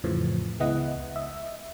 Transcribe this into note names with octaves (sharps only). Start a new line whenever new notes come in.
F2 A2 C#3 E3 F3
C#2 G#3 B3 E4 D#5 F#5
D#5 E5